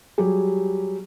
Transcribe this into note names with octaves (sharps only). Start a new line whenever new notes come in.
F#3 G3 G4 G#4